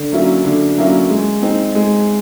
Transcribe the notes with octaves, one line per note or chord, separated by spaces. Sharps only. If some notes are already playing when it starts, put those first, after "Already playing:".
Already playing: D3
F#3 A#3 C#4 E4
D3
F#3 A#3 C#4 E4
G#3
C4 D#4
G#3